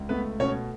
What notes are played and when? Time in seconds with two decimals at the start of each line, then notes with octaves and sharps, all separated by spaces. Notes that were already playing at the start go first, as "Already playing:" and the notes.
Already playing: C#2
0.09 A3 B3 B4
0.40 B2 C#4 C#5